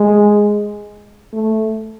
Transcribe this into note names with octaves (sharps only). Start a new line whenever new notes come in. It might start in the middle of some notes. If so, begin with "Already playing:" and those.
Already playing: G#3
A3